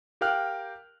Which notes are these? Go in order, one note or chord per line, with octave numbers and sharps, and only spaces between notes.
G4 A#4 F5 G5 F6 F#6